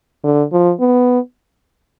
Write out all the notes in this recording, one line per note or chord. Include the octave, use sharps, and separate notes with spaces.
D3
F3
B3